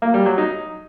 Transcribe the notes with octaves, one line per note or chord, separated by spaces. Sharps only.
A#3
G3
F#3
D#4